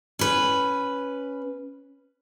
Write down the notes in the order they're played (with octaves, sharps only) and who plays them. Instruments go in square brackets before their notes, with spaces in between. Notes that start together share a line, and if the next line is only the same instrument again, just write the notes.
[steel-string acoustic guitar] C#4 B4